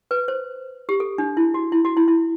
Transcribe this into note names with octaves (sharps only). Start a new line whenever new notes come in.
B4
C5
G4
A4
D4
E4
F#4
E4
F#4
E4
E4